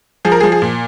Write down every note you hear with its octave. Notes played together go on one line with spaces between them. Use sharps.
F3 G#4
A#4
G#4
F3
G#4
A#2